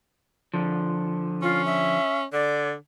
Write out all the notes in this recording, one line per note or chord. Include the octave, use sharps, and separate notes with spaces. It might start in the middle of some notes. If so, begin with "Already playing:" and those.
D3 F3
C#4 F4
E5
D3 D5